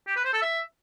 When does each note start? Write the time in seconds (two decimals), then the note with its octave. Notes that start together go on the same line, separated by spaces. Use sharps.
0.07 G4
0.16 B4
0.25 C5
0.33 A4
0.42 E5